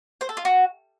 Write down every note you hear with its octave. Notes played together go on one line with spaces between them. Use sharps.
C5
A4
F4
F#4